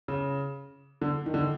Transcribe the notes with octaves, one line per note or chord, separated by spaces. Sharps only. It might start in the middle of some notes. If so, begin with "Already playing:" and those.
C#3
D3
D#3
D3
D#3